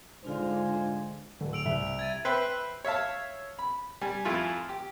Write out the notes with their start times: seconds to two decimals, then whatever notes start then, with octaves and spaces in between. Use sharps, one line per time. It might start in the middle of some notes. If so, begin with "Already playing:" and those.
0.25 G#2 D3 G#3 D4 F4 C5 F5 G#5
1.41 D1 D3
1.53 E6 D7 F7
1.66 C2 E5
1.86 E5
1.99 G#6 A6 D#7
2.25 B4 C5 E5 G5
2.85 C#5 E5 F5 A5
3.59 B5
4.01 G3 G#5
4.25 F2 A3 E4 F4 G#5
4.69 G4